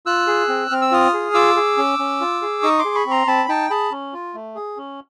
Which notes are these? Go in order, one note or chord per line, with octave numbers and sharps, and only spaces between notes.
F4 E6 F#6
G#4
C4
C4 F6
E6
F4 D#6 F6
G#4
F4 D6 E6
G#4
C#4
C#4
F4
G#4
D#4 C#6 D#6
C6 D6
G#4
B5 C#6
C4
A#5 C6
C4 A5 B5
D#4 G5 A5
G#4 A5 B5
C#4
F4
A3
G#4
C#4